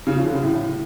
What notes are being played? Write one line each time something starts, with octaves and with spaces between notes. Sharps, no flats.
C#3
F3
D3
C#3
A2